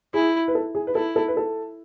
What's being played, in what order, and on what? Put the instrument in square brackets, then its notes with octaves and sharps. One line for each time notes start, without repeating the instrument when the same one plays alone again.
[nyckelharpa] E4 [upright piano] G#4
[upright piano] B4
A4
G#4
B4
[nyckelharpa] E4 [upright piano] A4
[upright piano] A4
B4
A4